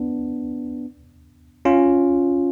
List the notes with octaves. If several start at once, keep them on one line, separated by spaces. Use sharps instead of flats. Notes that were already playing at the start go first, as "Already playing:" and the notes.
Already playing: B3 D4
C#4 F4